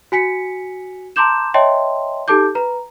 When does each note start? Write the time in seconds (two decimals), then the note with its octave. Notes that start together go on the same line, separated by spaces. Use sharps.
0.12 F#4 G#5 B6 C#7
1.16 A5 A#5 C6 D6 G6 E7
1.54 C#5 D#5 E5 G5 A5 C6
2.28 D#4 G4 A4 A5 D6 G6
2.55 B4 A#5